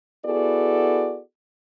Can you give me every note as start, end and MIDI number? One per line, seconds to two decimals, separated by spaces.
0.25 1.19 59
0.25 1.19 64
0.25 1.19 66
0.25 1.19 68
0.25 1.19 69
0.25 1.19 74